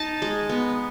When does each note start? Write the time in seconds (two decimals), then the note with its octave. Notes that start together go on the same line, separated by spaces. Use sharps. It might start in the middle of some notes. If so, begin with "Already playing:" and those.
Already playing: D#4 A5
0.22 G#3
0.49 B3